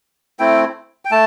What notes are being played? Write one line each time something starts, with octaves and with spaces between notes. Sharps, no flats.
A3 C4 E4 G5
G5
A3 A5